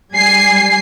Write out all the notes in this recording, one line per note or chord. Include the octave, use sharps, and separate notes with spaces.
G3 G#5 C7